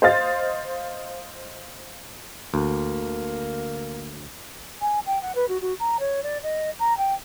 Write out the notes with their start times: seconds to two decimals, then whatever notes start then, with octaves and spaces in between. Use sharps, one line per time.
0.02 C5 D#5 F5 A6
2.54 D2 A#3
4.81 G#5
5.06 G5
5.22 F#5
5.35 B4
5.49 F#4
5.61 F#4
5.80 A#5
6.00 C#5
6.23 D5
6.43 D#5
6.79 A#5
6.97 G5